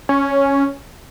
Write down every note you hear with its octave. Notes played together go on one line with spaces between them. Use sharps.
C#4